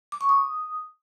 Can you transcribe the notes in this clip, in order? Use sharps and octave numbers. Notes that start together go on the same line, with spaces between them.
D6
C#6
D#6